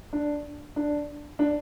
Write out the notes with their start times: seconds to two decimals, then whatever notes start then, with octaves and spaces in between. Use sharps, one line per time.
0.13 D4
0.76 D4
1.39 D4